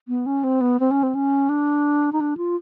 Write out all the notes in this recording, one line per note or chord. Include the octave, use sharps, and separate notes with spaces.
B3
C#4
C4
B3
C4
C#4
C4
C#4
D4
D#4
D4
F4